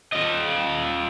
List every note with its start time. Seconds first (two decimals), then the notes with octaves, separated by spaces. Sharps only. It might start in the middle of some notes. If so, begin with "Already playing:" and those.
0.12 F4 D#5